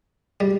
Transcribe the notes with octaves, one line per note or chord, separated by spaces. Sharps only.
G3